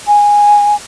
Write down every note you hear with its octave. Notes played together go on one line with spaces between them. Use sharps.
G#5